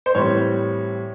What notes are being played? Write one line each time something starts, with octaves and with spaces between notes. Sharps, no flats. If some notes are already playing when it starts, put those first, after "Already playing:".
C5
A2 E3 G3 C4 C#5